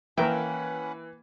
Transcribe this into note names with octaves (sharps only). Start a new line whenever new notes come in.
E3 A#3 C#4 A#4 B4 E5 F#5 G5